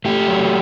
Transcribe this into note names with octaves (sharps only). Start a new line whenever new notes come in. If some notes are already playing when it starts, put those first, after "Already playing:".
A3 G4
F#3